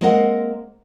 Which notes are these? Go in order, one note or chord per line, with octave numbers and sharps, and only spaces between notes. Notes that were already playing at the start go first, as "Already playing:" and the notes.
G#3 A#3 C4 A#4 D#5 F#5